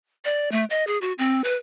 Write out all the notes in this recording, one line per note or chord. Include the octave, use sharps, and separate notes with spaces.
D5
A3
D#5
G#4
F#4
C4
B4